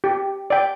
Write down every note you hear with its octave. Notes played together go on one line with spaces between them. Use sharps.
G4
D5 G5